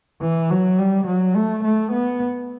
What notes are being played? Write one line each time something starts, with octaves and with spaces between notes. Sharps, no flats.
E3
F#3
G3
F#3
A3
A3
B3